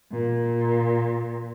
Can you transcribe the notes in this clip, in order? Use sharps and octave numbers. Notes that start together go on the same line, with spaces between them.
A#2